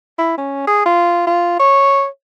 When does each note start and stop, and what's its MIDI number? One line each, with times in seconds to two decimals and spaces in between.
0.19 0.37 64
0.38 0.65 61
0.67 0.81 68
0.86 1.24 65
1.27 1.58 65
1.60 2.06 73